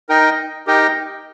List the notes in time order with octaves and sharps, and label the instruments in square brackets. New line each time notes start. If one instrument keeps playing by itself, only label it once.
[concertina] D#4 A#4 D#5 G5
D#4 G4 A#4 D#5 G5